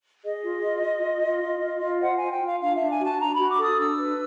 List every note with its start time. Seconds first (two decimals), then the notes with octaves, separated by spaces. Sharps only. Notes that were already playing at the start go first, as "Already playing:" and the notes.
0.24 G#4 D#5
0.44 F4
0.64 F4
0.83 F4
1.03 F4
1.22 F4
1.43 F4
1.62 F4
1.82 F4
2.01 C5 F#5
2.16 F4 G#5
2.31 G5
2.41 F4
2.46 F5
2.61 D4 F5
2.75 D4 E5
2.90 G#5
3.00 F#4 A5
3.20 D4 A#5
3.34 B5
3.39 F#4
3.49 D6
3.59 A4 D#6
3.79 D4 E6
3.98 B4